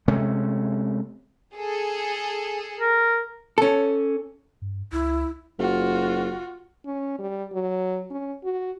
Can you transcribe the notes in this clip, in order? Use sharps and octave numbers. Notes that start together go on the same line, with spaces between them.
C3 G#3 A3 C#4
G#4 A4
A#4
C#4 A4
G2
C#2 E4
F#1 F4 F#4
C#4
G3
F#3
C#4
F#4